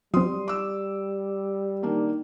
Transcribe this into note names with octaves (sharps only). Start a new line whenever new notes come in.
F#3 G3 C4 C6 D#6
D6 E6
D#3 A#3 D4